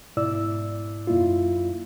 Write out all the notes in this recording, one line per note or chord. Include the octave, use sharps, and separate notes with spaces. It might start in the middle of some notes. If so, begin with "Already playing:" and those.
G#2 B2 E4 D5 E6
F#2 A#3 E4 F4